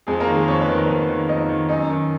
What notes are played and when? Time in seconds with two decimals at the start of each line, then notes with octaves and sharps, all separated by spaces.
0.07 F2 G#3 G#4
0.20 A#3 A#4
0.27 D#3
0.35 G#3 G#4
0.48 F2 C#5
0.61 B4
0.68 D#3 A#4
0.86 F2 B3 B4
1.08 D#3
1.29 F2 D#4 D#5
1.49 D#3
1.69 F#2 D#4 D#5
1.90 D#3